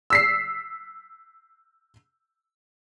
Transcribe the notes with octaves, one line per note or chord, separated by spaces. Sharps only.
E6 B6 C7